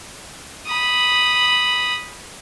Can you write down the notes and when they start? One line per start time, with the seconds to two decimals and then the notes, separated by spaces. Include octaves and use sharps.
0.67 B5 D#6